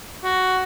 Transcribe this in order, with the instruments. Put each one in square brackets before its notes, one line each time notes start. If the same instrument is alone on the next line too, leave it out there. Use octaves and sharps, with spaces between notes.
[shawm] F#4